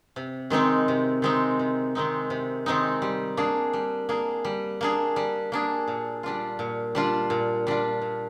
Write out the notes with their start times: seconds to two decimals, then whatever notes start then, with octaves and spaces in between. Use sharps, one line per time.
0.16 C3
0.50 D#3 G#3 C4 D#4
0.88 C3
1.22 D#3 G#3 C4 D#4
1.59 C3
1.95 D#3 G#3 C4 D#4
2.30 C3
2.66 D#3 G#3 C4 D#4
3.02 G3
3.37 A#3 D4 G#4
3.73 G3
4.09 A#3 D4 G#4
4.45 G3
4.81 A#3 D4 G#4
5.16 G3
5.52 A#3 D4 G#4
5.88 A#2
6.23 G3 D4 F4
6.59 A#2
6.95 G3 D4 F4
7.30 A#2
7.67 G3 D4 F4
8.01 A#2